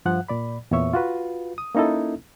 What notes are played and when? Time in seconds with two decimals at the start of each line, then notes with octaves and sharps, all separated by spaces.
0.05 G2 F3 F#5 F#6
0.29 A#2 D5 B5
0.71 E2 A#2 B3 C#5 E5 C#6
0.93 F4 F#4 B4
1.58 D#6
1.75 A#3 C#4 D#4 E4 A4